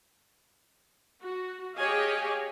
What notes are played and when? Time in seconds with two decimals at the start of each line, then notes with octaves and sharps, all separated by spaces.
1.22 F#4
1.77 G4 G#4 C#5 D#5 F5 G#5